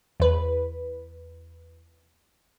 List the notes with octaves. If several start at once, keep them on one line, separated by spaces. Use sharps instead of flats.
E2 B4